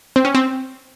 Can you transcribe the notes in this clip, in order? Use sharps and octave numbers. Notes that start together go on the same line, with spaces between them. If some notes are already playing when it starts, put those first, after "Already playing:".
C4
C#4
C4